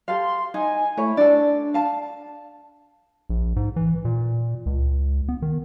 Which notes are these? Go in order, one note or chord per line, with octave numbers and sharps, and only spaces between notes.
G4 A4 F5 C6
D#4 G#5
A3 E4 C#5
D4 A4 D5
F5 A5
A#1
G#2
E3
A#2
C#2
B3
D#3